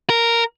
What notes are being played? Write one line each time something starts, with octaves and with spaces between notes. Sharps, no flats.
A#4